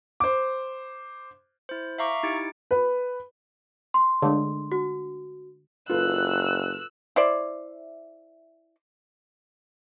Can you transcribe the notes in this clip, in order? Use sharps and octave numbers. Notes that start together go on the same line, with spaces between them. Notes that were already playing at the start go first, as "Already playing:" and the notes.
C5 D6
E4 C5
E5 F5 A#5 C#6 D6
D#4 E4 G4 A6 C#7 D7
B4
C6
D3 G#3
F#4
F#1 F4 A4 B4 E6 F#6
E4 C5 D5